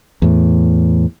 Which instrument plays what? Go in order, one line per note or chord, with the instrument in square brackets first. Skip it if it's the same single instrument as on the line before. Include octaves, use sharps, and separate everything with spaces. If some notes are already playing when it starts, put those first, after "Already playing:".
[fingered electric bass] E2 A2